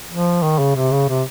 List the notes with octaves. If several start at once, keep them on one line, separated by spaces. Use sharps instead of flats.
F3
D#3
C#3
C3
C#3
C3